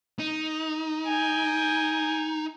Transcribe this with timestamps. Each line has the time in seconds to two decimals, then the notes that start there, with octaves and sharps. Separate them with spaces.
0.19 D#4
1.07 G5 G#5